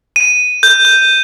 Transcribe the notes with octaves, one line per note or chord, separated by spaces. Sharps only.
D#7
G6
G6